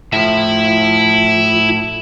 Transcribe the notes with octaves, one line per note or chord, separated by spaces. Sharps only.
A2 F3 E4 E5